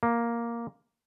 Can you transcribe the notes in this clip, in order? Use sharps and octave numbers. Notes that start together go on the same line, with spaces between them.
A#3